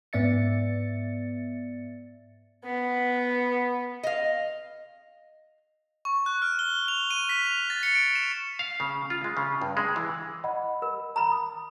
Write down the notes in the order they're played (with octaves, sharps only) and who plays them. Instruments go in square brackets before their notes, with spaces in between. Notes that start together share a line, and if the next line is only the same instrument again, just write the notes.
[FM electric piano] G#2 B3 D5 E5 A6 C#7
[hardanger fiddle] B3
[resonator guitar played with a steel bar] D#5 F5
[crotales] C#6
F#6
F6
G7
F7
D#7
B6
F7
A6
C#7
D7
E7
[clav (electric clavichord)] F5
C#3
F4
G#3
C#3
G2
G#3
E3
[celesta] D#5 F#5 B5
[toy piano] A#4
A#5 B5
[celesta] D#6